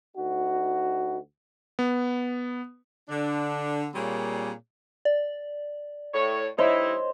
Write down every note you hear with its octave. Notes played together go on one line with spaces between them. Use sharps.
D2 D#4 F#4
B3
D3 D4
A#2 G3 A#3 C4 G#4 C#5
D5
A2 C#5
G3 D#4 E4 C5 C#5 D#5